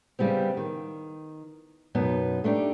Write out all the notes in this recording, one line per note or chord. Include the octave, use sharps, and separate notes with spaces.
C#3 G3 B3 C4
D#3
F#2 B2 B3 D#4
A3 D4 D#4 G4